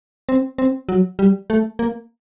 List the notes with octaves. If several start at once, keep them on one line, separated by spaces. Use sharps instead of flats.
C4
C4
F#3
G3
A3
A#3